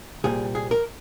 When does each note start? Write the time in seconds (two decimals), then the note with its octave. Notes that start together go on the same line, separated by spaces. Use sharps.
0.24 C2 A#2 G3 G#4
0.55 G#4
0.71 A#4